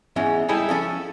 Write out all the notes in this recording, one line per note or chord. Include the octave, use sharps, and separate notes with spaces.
E2 G#2 G#3 C#4
G3 G#3 D#4 E4 G#4 A4
F3 C#4 A4